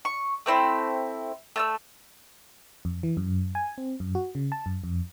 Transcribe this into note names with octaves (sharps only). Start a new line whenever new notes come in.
C#6
A3 C4 E4 C6
A3 A5 E6
F2
E3
F#2
G#5
C4
F#2
F#4
C#3
A5
F#2
F2